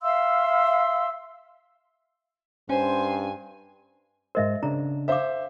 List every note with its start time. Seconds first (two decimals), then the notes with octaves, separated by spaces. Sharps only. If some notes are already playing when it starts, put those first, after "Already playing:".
0.03 E5 F5 C6 E6
2.69 G2 C#4 C5 G#5
4.35 G#2 G#3 A#4 C5 D#5 E5
4.63 C#3 D4 A#5
5.08 A4 C5 E5 F5 D6